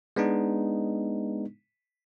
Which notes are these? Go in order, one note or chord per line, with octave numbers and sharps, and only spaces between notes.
G#3 B3 D4 D#4